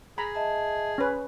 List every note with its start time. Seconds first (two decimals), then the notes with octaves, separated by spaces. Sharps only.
0.18 G#4 A#5 B5
0.35 D#5 E5 A5
0.98 C#4 B4